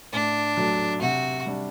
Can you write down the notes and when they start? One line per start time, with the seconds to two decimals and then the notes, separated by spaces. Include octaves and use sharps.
0.12 A2 D4
0.57 F#3 A3
1.01 C3 F#4
1.46 G3 D4